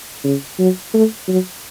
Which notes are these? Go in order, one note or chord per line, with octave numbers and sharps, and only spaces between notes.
C#3
F#3
A3
F#3